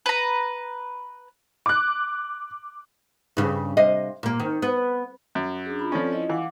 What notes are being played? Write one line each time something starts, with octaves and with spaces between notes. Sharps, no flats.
B4 A#5
D6 F#6
G2 C#3
C3 D#5 F5
A#2 A#3
D#3
B3
F#2
D4 G#4
F4 B5
F3 C4 C#4 A4 D5
E4 F4 D#5
E3 F5 F#5 D6